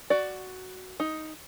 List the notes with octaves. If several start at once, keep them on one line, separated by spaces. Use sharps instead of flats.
F#4 D5
D#4